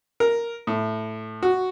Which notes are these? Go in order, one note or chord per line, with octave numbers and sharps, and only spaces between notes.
A#4
A2
F#4